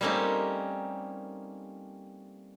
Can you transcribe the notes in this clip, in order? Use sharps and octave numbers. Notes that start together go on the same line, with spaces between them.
G3 A3 A#3 C4 C#4 D#4